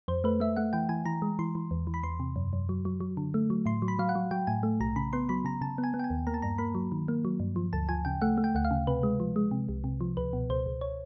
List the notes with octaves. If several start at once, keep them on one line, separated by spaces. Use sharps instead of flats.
F2 C5
A3 B4
A3 E5
A3 F#5
E3 G5
E3 G#5
E3 A#5
G#3
E3 C6
E3
E2
E3
B5
E2 C6
C3
F#2
F#2
F#3
F#3
F#3
D3
A3
F#3
A2 C6
F#3
B5
F#3 F5
F#5
F#3
F#3 G5
A2 G#5
A3
B1 A#5
C#3 B5
B3 C6
F#3 B5
C#3 A#5
C#3 A5
B3
G#5
B3
G5
G#5
D#2
A#3 A#5
A5
G2 A#5
A#3 B5
F#3
D#3
A#3
F#3
G2
F3
D2 A5
F3 G#5
C#3 G5
A3 F#5
A3
G5
D2 F#5
F5
C#3
C3 B4
G#3
F3
G#3
C3
C2
C3
F3
C#2 B4
B2
C#2 C5
C#2
C#5